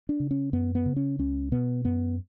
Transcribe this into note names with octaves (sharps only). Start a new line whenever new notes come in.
D4
C#3
C#4
F#2 B3
B3
C#3
C#4
C#2 C#4
B2 B3
F#2 B3